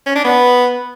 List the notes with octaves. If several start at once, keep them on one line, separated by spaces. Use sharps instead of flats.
C#4
D4
B3